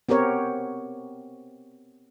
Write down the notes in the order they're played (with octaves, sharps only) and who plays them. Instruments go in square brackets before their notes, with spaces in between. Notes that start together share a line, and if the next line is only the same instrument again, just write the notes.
[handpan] B3 C4 G4 A#4 C#5